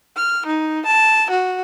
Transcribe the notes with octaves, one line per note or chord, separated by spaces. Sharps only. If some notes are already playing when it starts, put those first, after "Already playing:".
F6
D#4
A5
F#4